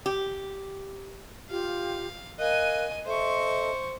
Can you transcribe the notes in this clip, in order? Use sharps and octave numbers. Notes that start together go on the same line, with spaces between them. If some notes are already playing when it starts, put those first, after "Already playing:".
G4
F4 G4 F5
A#4 D#5 F5 G#5 F#6
A4 C5 D#5 E5 C#6